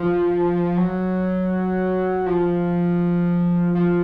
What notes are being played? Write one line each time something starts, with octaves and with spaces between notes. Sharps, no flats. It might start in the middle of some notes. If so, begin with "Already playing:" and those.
Already playing: F3
F#3
F3
F3